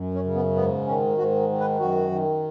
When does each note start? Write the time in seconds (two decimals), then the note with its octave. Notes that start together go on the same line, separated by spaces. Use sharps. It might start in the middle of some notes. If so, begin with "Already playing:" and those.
Already playing: F#2
0.14 C#4
0.25 C#3
0.35 B3
0.56 G#2 B3
0.86 D#3 C#4
1.18 G#2 F#4
1.49 D#3
1.60 B4
1.80 F#2 F#4
2.11 D#3